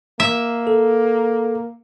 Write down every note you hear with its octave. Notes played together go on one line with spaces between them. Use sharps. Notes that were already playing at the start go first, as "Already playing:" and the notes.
A#3 E5
A4